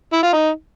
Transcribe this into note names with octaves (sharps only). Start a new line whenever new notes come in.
E4
F4
D#4